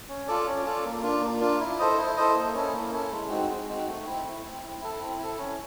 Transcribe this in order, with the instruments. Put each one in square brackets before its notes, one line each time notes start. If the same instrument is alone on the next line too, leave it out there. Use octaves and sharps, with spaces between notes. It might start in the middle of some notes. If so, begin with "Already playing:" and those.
[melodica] C#4
F4 A4 D5
C#4
F4 A4 D5
A#3
D4 F4
A#3
D4 F4
E4
A4 C5 D#5
E4
A4 C5 D#5
A#3
C#4 E4 A4
A#3
C#4 E4 A4
G#3
C4 D#4 F#4
G#3
C4 D#4 F#4
A3
C4 E4
A3
C4 E4
C4
E4 A4
C4
E4 A4
C#4